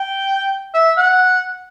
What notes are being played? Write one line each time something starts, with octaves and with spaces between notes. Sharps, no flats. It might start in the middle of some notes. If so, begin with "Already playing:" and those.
Already playing: G5
E5
F#5